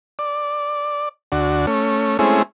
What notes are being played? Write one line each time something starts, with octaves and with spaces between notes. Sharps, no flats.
D5
D2 D4 F#4
A3 C#4
G#3 A3 C4 C#4 E4 G#4